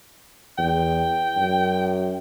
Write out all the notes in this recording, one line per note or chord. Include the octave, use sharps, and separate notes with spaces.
E2 G5
F#2